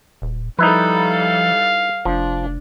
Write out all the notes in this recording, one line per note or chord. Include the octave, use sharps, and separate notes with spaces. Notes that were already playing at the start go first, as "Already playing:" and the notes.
D#1
F3 G3 D#4 E4 A4 B4
F5
F1 F3 D4